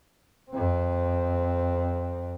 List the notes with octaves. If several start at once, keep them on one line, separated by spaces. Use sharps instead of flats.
F2 C4